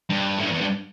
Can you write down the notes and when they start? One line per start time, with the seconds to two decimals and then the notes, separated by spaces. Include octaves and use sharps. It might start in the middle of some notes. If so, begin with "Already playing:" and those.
0.10 G2
0.38 A2
0.44 G2
0.51 E2
0.61 G2